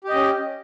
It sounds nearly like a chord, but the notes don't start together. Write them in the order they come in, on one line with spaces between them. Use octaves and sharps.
G4 D#5 C#4